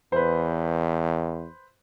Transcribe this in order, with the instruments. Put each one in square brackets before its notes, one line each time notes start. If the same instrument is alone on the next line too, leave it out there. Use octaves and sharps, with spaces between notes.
[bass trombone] E2 [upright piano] B4 C5